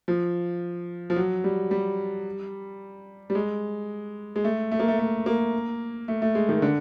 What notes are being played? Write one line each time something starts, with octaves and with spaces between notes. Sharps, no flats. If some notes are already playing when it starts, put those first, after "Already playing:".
F3
F3
F#3
G3
G3
G3
G#3
G#3
A3
A3
A#3
A3
A3
A#3
A3
A3
G#3
D#3
D3